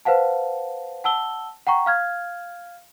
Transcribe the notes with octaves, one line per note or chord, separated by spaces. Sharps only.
B4 C5 F5 F#5 A5
F#5 A5 E6 G7
F#5 G5 A#5 C#6
F5 F6 G#6